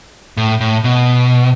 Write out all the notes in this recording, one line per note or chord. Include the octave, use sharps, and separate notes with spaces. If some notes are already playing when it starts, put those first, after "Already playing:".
A2
A2
B2